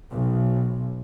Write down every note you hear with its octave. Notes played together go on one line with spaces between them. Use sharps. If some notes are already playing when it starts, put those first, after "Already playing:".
B1